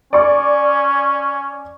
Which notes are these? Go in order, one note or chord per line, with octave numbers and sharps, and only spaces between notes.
C#4 D5 C#6